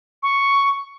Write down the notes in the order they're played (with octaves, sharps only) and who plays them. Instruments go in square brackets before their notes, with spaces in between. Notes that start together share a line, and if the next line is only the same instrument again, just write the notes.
[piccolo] C#6